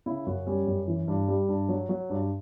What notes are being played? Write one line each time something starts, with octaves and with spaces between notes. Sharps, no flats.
C#3 E4
F#2 F#4
G3 C#4
F#2
E3
G2
G3
G2
F#3
F#3
G2